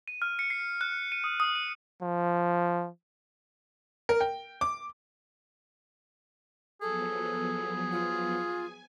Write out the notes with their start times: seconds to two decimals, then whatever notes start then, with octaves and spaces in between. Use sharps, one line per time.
0.08 D#7
0.22 F6
0.39 C#7
0.50 C7
0.81 F#6
1.12 D#7
1.24 D#6
1.40 D#6
1.56 D#7
2.01 F3
4.09 A#4
4.21 G5
4.61 D6
6.82 F3 F#3 B3 G#4 A4
7.92 F4
8.35 G#5